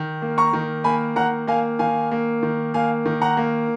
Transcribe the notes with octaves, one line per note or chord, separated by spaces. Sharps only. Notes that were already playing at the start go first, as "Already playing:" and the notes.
Already playing: D#3
A#3
A#5 C#6
D#3
A#3 G#5 B5
D#3 F#5 A#5
A#3 F5 G#5
D#3 F5 G#5
A#3
D#3
A#3 F5 G#5
D#3
F#5 A#5
A#3